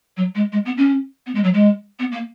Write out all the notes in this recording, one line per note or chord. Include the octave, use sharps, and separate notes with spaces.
F#3
G#3
G#3
B3
C#4
B3
G#3
F#3
G#3
B3
A#3